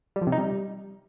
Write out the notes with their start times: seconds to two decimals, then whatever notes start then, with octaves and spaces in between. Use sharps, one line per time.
0.16 G3
0.21 F3
0.27 C3
0.32 D#4
0.38 G3